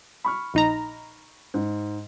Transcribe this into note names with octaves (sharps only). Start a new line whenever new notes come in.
B5 C#6 F6
A#1 D#4 A#5
G#2